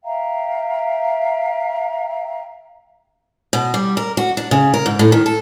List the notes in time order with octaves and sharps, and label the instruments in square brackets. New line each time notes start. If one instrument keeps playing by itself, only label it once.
[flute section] E5 F5 G5 A#5
[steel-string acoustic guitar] B2
G3
A#4
F#4
D4
C#3
A#4
G#2
A2
D#3
A4